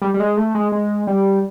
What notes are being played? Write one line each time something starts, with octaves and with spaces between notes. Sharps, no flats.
G3
G3
G#3
A3
G#3
G#3
G3